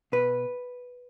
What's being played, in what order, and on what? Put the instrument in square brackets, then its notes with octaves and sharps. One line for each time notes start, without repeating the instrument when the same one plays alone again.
[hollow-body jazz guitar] B2 B4